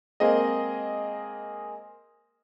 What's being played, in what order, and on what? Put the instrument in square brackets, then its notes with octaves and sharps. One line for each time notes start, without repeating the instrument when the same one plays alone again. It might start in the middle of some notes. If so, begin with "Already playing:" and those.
[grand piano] G#3 A#3 C4 G#4 D#5